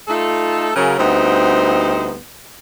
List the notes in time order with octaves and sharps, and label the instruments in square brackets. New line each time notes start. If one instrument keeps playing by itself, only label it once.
[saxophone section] A3 D#4 F4 A4
C#3 F#3 A#4
D2 G3 B3 C4 D#4 C5